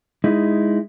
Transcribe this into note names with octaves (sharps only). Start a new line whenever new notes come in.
G#3 D#4 E4